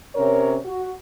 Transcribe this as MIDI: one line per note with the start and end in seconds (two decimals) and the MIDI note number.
0.15 0.57 48
0.15 0.57 61
0.15 0.57 70
0.15 0.57 73
0.65 0.91 66